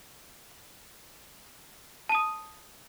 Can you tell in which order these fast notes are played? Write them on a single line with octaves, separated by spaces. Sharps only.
A5 D#7 D#6